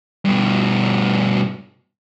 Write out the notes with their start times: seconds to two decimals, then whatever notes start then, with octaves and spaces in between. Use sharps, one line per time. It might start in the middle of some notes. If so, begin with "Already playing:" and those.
0.25 G2 B2